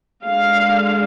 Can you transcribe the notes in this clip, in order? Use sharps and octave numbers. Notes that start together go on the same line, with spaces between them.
D3 G#3 D4 F5